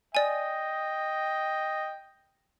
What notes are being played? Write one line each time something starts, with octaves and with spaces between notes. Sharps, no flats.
D5 D#5 G5 G#5